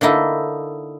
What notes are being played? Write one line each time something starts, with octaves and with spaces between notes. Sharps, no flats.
D3 A#3 D#4 E4